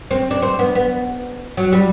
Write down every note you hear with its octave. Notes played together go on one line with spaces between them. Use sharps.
C4
D4
C4
B3
B3
F#3
G3